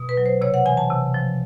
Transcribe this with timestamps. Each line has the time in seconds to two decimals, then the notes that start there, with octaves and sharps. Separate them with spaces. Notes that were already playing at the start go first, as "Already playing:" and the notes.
Already playing: B2
0.09 B4
0.17 F#3
0.26 C5
0.41 C3 C#5
0.54 F#5
0.66 E3 G#5
0.77 A5
0.91 C3
1.14 F3